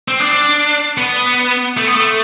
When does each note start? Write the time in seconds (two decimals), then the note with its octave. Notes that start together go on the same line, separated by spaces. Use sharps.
0.08 C4
0.20 D4
0.97 B3
1.77 A3
1.87 B3
1.95 A3